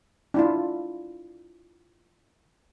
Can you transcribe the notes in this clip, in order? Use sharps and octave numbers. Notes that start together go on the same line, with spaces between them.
D4 E4 F4